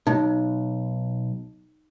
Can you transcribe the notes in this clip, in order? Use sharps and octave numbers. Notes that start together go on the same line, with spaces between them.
B1 D#4